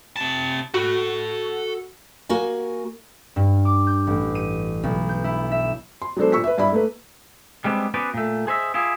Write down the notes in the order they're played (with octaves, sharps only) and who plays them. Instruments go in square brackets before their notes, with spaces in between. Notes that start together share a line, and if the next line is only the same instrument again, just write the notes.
[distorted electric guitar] C3 A5
[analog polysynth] F#4 [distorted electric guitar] A4 B5
[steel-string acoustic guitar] A#3 F#4 G#5
[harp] G2
D6
G6
A1
D#7
B1
G6
E4
E5
[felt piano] C6
F#3 G#3 B3 D4 A4 C5
A#2 C#6 E6 B6
B4 E5
G2 E4 D5 B5
A3 A#3 B4
[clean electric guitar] G3 G#3 B3 C4 D4
B3 C#4 F#4 B4 C5 D5
A#2 A3
G#4 C5 D#5 E5
E4 F4 G4 G#4